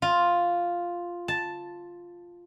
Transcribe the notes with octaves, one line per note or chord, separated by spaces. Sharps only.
F4
A5